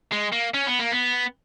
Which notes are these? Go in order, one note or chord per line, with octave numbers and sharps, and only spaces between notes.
G#3
A#3
C#4
B3
A#3
B3